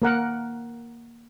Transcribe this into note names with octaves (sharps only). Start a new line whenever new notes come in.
A#3 A#4 F#5